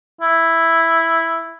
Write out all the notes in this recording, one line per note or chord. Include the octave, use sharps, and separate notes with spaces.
E4